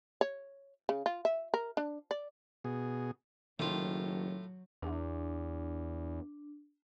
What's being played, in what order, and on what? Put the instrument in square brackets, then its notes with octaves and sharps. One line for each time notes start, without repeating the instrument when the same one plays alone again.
[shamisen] C#5
C#3
F4
E5
A#4
D4
D5
[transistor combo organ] B2 G#4
[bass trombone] F#1 [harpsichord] A2 F4 [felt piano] D#3 [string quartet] F#3
[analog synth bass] E2 [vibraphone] D4